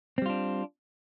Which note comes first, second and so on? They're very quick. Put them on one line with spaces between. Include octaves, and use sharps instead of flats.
C4 G3 F4 D4